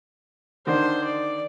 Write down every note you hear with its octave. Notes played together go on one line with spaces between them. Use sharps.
D3 D#3 D4 C5
D5